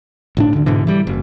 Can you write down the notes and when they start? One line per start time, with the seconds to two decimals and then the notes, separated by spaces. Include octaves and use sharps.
0.37 A1 A2 D4
0.53 D2 D3
0.66 G#2 B2 D3 E3
0.87 E3 G3
1.07 F#1